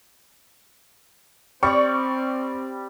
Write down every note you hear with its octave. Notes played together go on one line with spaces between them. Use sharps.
G3 C4 C#5 D5 C#6